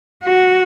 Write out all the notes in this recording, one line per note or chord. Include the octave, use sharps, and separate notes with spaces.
F#4